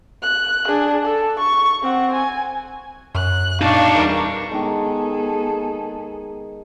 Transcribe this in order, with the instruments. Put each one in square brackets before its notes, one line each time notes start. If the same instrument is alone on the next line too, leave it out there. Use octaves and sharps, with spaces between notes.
[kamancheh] F#6
D4 G#4
A4
C#6
C4 F#5
G#5
[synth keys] F#2 [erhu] F#6
[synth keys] A#2 [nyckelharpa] D4 C#6 [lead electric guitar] D#4 A5 [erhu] F5
[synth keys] E2 E3 G3 [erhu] A#4
[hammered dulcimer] D#3 G#3 [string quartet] B3 G#4 A4